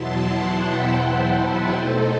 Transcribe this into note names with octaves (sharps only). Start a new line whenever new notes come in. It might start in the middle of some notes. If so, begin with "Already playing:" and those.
Already playing: E2 B2 F#3 B3 E4 A5 C6
F#5 A5
E5 G5
C5 E5
B4
B2 A3 D#4 A4 C5